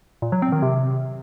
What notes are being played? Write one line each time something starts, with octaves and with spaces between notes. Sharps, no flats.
A#2
F#3
C4
D#3
C3